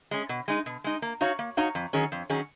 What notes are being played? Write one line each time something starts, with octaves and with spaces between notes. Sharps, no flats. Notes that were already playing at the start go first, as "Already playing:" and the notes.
G#3 C#4
B2
G#3 D#4
B2
G#3 D#4
A#3
D#4 F#4 C#5 F5
A#3
D#4 F#4 C#5 F5
F2
D#3 F#3 C#4 G#4
F2
D#3 F#3 C#4 G#4